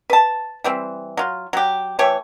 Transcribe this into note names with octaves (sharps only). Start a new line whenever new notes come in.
B4 A5
E3 G3 C4
F#3 F4
F#3 G4
E3 A3 G4 C#5